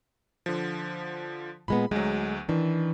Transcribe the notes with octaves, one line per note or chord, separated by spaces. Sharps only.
D3 F3
A#2 G#3 B3 B5
D2 F#3 G#3
D#3 E3 D4